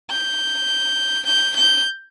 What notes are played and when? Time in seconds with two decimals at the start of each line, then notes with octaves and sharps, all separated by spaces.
0.11 G6
1.27 G6
1.57 G6